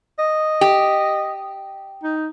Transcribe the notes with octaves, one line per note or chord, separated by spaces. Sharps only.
D#5
G4
D#4